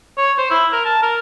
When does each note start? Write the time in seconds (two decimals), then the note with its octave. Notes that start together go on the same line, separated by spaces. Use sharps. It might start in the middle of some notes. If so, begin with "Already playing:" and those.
0.17 C#5
0.38 C5
0.50 E4
0.72 A#4
0.85 A5
1.02 A#4